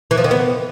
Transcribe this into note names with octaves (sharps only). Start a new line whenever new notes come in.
E3
F3
D#3
B3